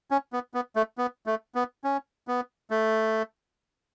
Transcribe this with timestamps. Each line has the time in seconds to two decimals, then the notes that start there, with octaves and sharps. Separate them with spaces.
0.11 C#4
0.33 B3
0.54 B3
0.76 A3
0.98 B3
1.26 A3
1.55 B3
1.84 C#4
2.28 B3
2.70 A3